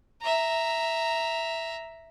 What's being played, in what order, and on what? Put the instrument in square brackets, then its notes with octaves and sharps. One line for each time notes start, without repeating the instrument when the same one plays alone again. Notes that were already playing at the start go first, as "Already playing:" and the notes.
[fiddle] E5 A#5